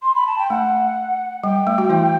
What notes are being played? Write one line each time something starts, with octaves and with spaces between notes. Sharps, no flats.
C6
B5
A5
G5
A3 F#5
G3 G5
A3
F#4
E3 E4